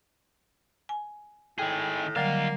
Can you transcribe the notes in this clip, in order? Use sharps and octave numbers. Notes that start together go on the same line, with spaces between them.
G#5
A2 D#3 G#4 G5
D3 D#3 F#3 G3 A#3 F5